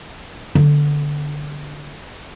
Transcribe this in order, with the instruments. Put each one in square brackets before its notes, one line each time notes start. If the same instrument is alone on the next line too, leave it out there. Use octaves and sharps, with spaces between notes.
[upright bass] D3 B3